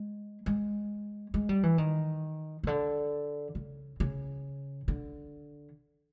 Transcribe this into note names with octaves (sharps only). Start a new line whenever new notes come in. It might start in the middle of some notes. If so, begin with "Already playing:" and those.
Already playing: G#3
G#3
G#3
G3
E3
D#3
C#3
D3
C#3
C#3
D3